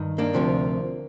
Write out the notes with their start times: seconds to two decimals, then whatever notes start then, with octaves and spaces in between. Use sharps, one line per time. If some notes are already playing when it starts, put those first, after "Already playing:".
Already playing: G2 D#3
0.18 A#3 D4
0.34 D2 C3 F3